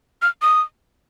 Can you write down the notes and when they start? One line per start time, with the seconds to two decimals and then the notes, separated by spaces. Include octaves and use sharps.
0.22 F6
0.42 D#6